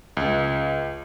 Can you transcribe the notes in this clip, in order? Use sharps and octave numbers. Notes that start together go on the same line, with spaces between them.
C#2